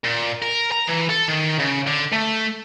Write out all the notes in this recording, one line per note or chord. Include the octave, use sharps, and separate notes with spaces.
A#2
A#4
A#5
E3
A4
D#3
C#3
D3
A3